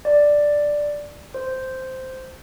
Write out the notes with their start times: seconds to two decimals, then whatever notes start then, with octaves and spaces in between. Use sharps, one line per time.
0.05 D5
1.34 C5